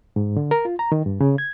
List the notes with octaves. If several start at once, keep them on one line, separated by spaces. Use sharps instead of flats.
G#2
D3
A#4
F4
A#5
D#3
G2
C#3
G#6